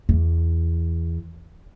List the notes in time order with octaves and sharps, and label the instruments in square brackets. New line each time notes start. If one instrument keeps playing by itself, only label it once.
[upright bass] E2